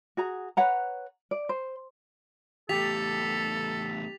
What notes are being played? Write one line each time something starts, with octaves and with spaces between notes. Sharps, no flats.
F#4 G#4 A#5
B4 C#5 F#5 A#5
D5
C5
E2 A3 G4 A4 A6 B6 F7